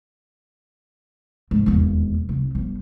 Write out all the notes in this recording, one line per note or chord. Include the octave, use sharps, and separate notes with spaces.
G#2
E1 D#2
C2
G1